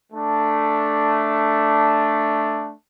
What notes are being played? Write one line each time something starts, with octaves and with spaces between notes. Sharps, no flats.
A3 D4